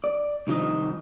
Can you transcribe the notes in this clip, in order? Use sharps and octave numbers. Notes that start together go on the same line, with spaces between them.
D5
C2 D#3 F3 D#4 D#5